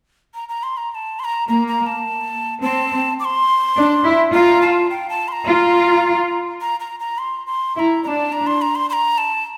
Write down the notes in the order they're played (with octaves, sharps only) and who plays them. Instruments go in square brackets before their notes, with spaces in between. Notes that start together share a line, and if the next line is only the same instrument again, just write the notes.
[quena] A#5
A#5
C6
A#5
A#5
A5
C6
A#5
[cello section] A#3 [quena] A#5
[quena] A#5
A5
[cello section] C4 [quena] A5
[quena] D6
C6
[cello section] D4
E4
[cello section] F4 [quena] A#5
[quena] A5
G5
A5
C6
A#5
[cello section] F4
[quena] A#5
A#5
A#5
C6
C6
[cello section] E4 [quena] A#5 C6
[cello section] D4 [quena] A5 A#5
[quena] A#5
C6
A#5
C6
C6
A#5
A5